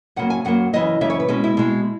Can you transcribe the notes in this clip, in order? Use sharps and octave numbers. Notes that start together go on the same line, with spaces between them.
F#2 C#3 F#3 A#3 F#5
G#5
F#2 C#3 F#3 A#3 F#5
F#2 C#3 E3 D#5
F#2 C#3 E3 E5
C#5
B4
B2 G#3 C#4
E4
B2 G#3